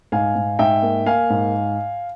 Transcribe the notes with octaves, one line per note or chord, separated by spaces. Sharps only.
G#2 F5 G#5
G#2
G#2 E5 G5
A#3
A#3 F5 G#5
G#2